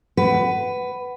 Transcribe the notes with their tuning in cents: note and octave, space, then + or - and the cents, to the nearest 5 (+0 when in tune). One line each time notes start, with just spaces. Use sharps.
B4 +10 F#5 +20